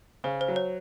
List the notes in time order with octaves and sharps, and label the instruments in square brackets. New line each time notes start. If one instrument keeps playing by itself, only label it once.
[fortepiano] C#3 [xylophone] C5
[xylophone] C5
[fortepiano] F#3
[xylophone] C#5